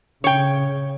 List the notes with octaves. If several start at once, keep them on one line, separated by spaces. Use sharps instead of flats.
C#3 C#5 G5